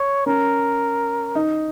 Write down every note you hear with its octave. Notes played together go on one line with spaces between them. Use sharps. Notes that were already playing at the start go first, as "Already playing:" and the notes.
Already playing: C#5
C#4 A#4
D#4